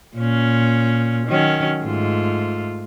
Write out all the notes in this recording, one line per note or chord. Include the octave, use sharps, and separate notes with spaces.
A#2 C#4
D#3 F#3 C#4
G#2 A3 F4